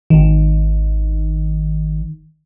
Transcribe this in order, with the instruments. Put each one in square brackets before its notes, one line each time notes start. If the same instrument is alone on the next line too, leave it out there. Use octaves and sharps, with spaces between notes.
[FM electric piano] G#1 D#3